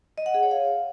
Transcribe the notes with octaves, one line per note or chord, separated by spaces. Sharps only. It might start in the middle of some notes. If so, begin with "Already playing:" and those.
D#5
F#5
G#4
C#5
F5